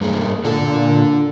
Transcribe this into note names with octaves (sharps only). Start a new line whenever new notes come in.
G2 G#3 A#3
A#2 D3 A4 A5
A#2